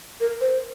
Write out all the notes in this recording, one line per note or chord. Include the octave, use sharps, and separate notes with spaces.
A#4
C5